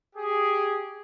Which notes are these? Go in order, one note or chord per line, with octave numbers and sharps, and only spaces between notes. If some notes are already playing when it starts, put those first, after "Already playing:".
G4 G#4